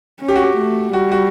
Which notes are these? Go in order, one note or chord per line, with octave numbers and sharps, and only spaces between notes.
C#4
G4
F#4
G4
A3
G3 F#4
F#4